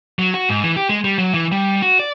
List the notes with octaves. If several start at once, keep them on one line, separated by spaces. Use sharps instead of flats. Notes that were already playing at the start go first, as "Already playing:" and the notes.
F#3
F#4
G#2
E3
G4
G#3
G3
F#3
E3
G3
F#4
D5